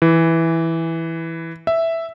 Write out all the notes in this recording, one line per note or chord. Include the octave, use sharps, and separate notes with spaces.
E3
E5